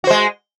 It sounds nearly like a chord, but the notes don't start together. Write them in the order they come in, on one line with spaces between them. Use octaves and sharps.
F#4 C5 G#3